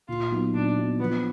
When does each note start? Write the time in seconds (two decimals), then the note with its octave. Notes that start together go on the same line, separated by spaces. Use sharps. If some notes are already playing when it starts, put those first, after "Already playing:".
0.08 A#2 F4
0.31 F#3 B3 D#4
0.54 A#2 D4
0.77 F#3 B3 D#4
1.00 F3 B3